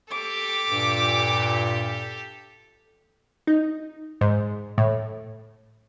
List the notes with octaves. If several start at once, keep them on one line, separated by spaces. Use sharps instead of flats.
G4 A4 D6
G2 A#2
D#4
G#2
A2